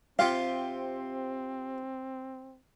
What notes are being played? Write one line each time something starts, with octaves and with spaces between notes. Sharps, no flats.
C3 C4 F4 G4 F5